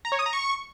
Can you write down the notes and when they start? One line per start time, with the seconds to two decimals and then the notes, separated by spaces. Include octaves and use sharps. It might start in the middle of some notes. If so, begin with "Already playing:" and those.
0.05 A#5
0.12 C#5
0.19 D#6
0.26 A#5
0.33 C#6